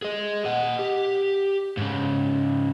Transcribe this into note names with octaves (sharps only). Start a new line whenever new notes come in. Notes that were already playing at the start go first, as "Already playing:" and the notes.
G#4 D#5
D#5 F#5
G4
G#2 C#3